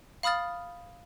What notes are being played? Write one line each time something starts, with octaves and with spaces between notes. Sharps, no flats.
F5 B5 D#6 F6 A6